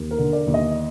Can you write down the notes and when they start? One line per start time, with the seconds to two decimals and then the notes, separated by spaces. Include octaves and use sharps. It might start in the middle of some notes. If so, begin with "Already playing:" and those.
Already playing: D#2
0.11 A#4
0.18 D3
0.33 D5
0.47 D#2
0.54 D#5